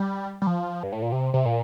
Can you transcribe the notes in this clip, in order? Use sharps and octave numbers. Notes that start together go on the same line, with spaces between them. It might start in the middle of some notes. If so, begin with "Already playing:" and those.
Already playing: G3
G3
F3
G2
A2
A#2
C3
C3
A#2